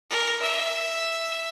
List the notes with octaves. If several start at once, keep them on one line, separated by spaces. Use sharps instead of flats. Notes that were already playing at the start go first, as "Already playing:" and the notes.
A#4
E5